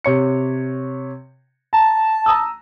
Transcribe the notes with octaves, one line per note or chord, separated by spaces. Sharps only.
C3 C#5 C#7
A5 A#5
A#5 D#6 E6